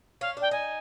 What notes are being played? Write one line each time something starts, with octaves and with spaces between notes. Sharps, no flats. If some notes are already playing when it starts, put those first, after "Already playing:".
C#4 F5
D4
G5
D#4 G#5